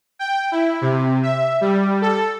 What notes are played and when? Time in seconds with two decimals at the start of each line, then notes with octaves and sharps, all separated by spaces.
0.19 G5
0.52 E4
0.81 C3
1.23 E5
1.61 G3
2.02 A4